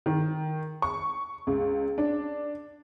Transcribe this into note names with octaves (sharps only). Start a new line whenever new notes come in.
D#3
C#6
C#2
D4